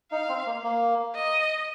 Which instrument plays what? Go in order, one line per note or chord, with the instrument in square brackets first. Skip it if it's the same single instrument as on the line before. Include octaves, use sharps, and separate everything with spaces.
[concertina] D#4 [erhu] F5
[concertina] C4
A#3
A#3
[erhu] D#5